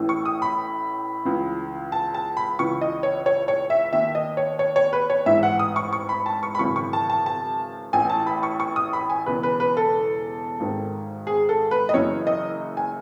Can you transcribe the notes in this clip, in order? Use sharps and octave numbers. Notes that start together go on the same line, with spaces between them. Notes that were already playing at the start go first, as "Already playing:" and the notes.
Already playing: A1 A2 E3
C#6
D#6
B5
C#2 C#3 E3
A5
A5
B5
C#2 C#3 E3 C#6
D#5
C#5
C#5
C#5
E5
D#2 D#3 E5
D#5
C#5
C#5
C#5
B4
C#5
A1 G#2 E3 E5
F#5
D#6
C#6
C#6
B5
A5
C#6
B5
G#1 F#2 C#3 E3 C#6
C#6
A5
A5
A5
A1 A2 E3 G#5
A5
B5
C#6
C#6
D#6
B5
G#5
E1 E2 C#3 B4
B4
B4
A4
G#1 G#2 D#3
G#4
A4
B4
D#5
F#1 F#2 C#3 E3 C#5
D#5
G#5